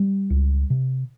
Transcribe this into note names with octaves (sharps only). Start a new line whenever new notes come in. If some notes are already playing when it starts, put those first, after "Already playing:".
Already playing: G3
C#2
C3